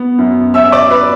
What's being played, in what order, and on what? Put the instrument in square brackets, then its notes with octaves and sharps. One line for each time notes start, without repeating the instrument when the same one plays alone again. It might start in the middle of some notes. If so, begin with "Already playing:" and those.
Already playing: [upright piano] B3
F#2
C#4 E5 E6
D5 D6
B4 B5